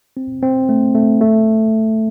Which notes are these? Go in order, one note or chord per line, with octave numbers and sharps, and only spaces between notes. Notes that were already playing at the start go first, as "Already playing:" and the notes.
C4
C4
A3
A3
A3